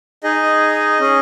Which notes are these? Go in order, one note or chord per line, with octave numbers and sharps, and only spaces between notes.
D#4 G#4 D#5
C#4 G#4